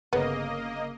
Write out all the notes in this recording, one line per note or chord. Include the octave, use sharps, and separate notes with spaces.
G1 C#3 A#3 B3 D#5